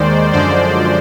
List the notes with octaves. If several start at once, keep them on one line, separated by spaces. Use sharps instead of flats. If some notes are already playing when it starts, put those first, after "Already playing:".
Already playing: D#2 D#3 G#3 C5 D5
F#2 D3 F3 G#3 C5 D5